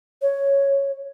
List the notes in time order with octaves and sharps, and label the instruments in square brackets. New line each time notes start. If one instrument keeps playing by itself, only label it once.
[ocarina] C#5